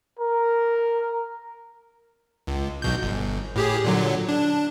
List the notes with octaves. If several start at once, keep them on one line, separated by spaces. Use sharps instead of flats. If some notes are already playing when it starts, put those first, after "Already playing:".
A#4
C#2
B1 B2 G6
G1
A2 G4 G#4
A#2 D3 F#3
D4